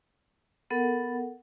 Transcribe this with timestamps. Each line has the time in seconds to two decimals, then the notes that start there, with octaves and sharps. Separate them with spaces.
0.70 B3 A4 A#4 F#5